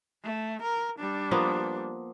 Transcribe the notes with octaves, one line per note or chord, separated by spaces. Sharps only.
A3
A#4
G3 D4
F3 A#3 B3